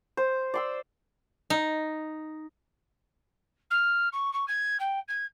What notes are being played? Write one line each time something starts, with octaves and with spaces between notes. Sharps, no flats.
C5
D5 C6 E6
D#4
F6
C#6
C#6
G#6
G5
G#6